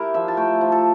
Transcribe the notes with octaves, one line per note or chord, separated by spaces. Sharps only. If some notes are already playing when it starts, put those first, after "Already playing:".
Already playing: E4 G4 A#4
F3 E5
A5
A3 G5
F3
A4